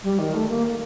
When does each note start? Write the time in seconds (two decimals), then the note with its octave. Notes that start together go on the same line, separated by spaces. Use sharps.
0.03 G3
0.19 D#3
0.34 A3
0.49 A#3